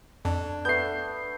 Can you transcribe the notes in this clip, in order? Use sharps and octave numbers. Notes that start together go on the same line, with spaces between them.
F2 D4
A3 B3 G6 C7